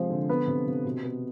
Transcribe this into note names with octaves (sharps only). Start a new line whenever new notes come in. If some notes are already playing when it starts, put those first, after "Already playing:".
Already playing: C3 F3 G#3 C5
D3
B3 B4
C3
C3
B2
B3